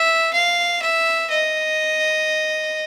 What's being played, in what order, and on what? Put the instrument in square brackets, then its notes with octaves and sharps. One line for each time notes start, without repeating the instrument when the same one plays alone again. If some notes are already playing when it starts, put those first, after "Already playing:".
Already playing: [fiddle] E5
F5
E5
D#5